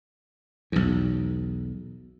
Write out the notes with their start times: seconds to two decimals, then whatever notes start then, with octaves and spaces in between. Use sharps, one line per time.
0.72 B1 E2